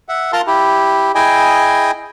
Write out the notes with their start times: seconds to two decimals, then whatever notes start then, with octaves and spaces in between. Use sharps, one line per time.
0.09 E5 F#5
0.33 F4 A#4 F5 A5 A#5 C6
0.47 E4 G4
1.15 E4 G#4 D#5 G5 G#5